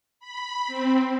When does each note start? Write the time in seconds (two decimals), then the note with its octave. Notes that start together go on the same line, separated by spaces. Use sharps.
0.20 B5
0.67 C4